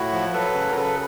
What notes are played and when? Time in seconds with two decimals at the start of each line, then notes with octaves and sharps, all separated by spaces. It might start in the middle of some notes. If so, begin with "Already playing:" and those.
Already playing: A2 E4 F#4
0.12 F3
0.33 F#3 A4 B4
0.54 C#3
0.71 A#4
0.76 C#3 A4 B4